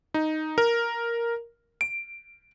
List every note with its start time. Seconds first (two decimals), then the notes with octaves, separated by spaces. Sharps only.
0.14 D#4
0.58 A#4
1.81 D7